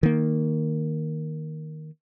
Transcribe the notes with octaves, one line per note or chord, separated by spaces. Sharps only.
D#3 A#3